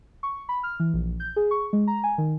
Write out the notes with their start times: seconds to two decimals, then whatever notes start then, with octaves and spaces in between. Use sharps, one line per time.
0.23 C#6
0.49 B5
0.63 F6
0.80 E3
0.94 A#1
1.20 G6
1.36 G#4
1.51 C#6
1.73 G#3
1.87 A#5
2.04 G#5
2.18 D#3